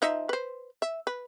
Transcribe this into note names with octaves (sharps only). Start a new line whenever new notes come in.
F3 D#4 E5
B4 C5
E5
B4